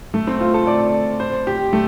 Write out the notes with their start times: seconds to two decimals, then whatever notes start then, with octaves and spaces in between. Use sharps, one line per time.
0.14 A3
0.27 C4
0.41 F4
0.54 A4
0.67 D5
1.20 C5
1.47 G4
1.73 A3